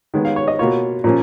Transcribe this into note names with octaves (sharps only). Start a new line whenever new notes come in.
D#3 G#3 B3
F5
C#5
D#5
B2 A#3 F4 C#5
A#2 F3 A#3 C#4